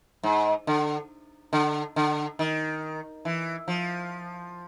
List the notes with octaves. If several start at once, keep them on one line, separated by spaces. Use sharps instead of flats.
G#2
D3
D3
D3
D#3
E3
F3